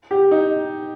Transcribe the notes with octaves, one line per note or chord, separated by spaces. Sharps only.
G4
D#4